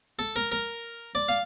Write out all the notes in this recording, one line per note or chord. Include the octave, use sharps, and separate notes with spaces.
A4
A#4
A#4
D5
F5